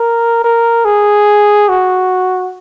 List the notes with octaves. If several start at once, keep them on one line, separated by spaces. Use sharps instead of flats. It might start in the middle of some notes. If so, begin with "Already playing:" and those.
Already playing: A#4
A#4
G#4
F#4